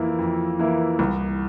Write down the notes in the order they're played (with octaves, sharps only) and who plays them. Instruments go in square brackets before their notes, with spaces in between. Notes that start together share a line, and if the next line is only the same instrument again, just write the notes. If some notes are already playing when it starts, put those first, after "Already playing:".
Already playing: [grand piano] F2 E3 A#3 E4
F2
E3 A#3 E4
C2